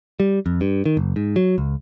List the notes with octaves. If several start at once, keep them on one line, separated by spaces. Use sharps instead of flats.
G3
F2
G2
D#3
F#1
G#2
F#3
C#2